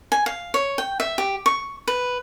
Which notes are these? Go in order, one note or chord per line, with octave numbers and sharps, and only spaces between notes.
G#5
F5
C#5
G5
E5
G4
C#6
B4